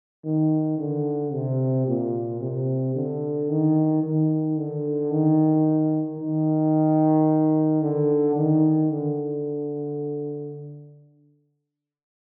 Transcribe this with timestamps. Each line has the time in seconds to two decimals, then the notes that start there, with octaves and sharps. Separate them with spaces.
0.24 D#3
0.78 D3
1.33 C3
1.87 A#2
2.41 C3
2.95 D3
3.49 D#3
4.03 D#3
4.57 D3
5.11 D#3
6.19 D#3
7.81 D3
8.35 D#3
8.90 D3